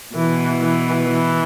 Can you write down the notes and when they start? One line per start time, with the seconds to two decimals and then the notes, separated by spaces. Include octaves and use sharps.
0.15 B2 E3
0.60 E3
1.05 E3